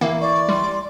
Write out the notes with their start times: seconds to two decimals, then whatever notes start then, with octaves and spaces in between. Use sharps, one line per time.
0.01 E3 A#3 E5
0.21 D5 C#6
0.49 G3 C6